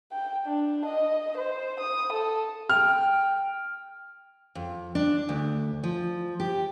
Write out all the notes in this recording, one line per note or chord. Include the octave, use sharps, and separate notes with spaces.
G5
D4
D#5
C5
D#6
A4
G5 F6
F2
D4
D2
F3
G4